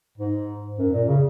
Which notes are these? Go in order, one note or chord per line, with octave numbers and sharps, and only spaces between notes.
G#2
F#2
A#2
C#3